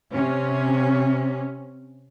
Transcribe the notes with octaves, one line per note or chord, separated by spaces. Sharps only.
C3 C#4